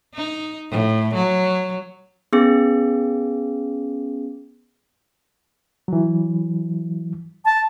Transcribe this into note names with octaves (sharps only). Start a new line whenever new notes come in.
D#4
A2
F#3
B3 C#4 G#4
E3 F#3
A5